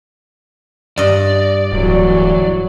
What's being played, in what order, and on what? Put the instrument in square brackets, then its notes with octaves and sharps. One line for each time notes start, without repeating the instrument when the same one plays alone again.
[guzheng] G2 D#5 [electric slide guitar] D5
[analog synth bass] D1 [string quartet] E3 F#3